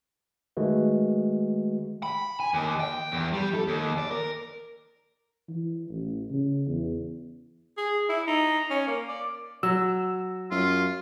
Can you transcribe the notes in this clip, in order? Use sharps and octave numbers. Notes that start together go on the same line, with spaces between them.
D#3 G#3 A3 F#4 B4
B5
G#5
D#2
G5
E2
G3
A4
D#2
D5
A#4
E3
A1
C#3
E2
G#4
E4
D#4
C#4
A#3
D5
F#3 E6
F#2 F4